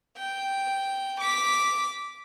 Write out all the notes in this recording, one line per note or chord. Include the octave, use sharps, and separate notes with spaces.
G5
D6 B6